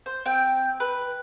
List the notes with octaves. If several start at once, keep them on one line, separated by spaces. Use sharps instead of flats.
C5
C4 G5
B4